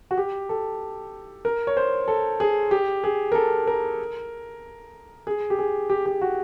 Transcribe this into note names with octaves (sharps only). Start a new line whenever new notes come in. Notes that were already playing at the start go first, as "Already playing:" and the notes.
F#4
G4
A4
A#4
C#5
C5
A4
G#4
G4
G#4
A#4
A4
A#4
G#4
G4
G#4
G4
G4
F#4